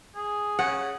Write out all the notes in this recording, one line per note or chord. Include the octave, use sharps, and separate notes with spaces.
G#4
C#3 F#5